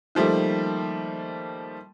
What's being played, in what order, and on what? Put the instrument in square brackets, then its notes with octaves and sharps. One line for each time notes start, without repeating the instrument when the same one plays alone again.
[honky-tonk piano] D#3 F3 G3 A3 A#3